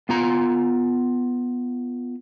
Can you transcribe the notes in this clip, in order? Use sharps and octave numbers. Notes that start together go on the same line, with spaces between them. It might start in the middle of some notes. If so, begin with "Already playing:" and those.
B3 F4 A#5